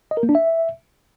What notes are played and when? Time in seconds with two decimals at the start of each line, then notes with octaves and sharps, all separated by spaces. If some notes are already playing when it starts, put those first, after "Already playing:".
0.11 D#5
0.17 A#4
0.23 A#3
0.29 D4
0.35 E5